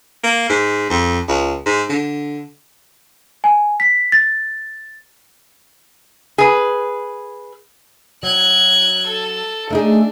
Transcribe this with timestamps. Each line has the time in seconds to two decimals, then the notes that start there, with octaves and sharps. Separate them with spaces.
0.24 A#3
0.49 G#2
0.90 F2
1.28 C#2
1.66 G#2
1.89 D3
3.44 G#5
3.80 B6
4.12 A6
6.38 G#4 B4
8.23 F#3 F#6 G#6
9.07 A4
9.70 A3 D4 D#4 G#4